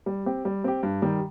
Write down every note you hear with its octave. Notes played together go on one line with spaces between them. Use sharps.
G3
C4 G4
G3
C4 G4
G2
D#3 G3